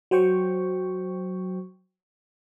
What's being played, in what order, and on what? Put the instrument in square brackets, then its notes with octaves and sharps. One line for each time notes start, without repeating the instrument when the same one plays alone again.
[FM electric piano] F#3 C5 G5 C#6